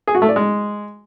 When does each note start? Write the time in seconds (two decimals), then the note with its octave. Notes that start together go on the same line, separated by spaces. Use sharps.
0.07 G#4
0.15 F#4
0.22 A3
0.29 D5
0.36 G#3